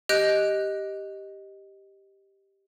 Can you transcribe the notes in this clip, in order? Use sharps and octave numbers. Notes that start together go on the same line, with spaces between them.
G4 D#5 F#6 G6 D7